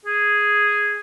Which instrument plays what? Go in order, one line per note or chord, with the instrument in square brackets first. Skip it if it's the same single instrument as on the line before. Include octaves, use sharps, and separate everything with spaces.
[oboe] G#4